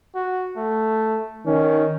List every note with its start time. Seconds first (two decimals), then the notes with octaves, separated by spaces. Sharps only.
0.15 F#4
0.57 A3
1.46 D#3 C#4